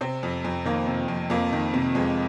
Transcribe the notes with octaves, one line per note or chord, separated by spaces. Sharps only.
C3 C4
F2
F2
D#3 A#3
C3
F2
F2 A#3
D#3
C3
F2 G#3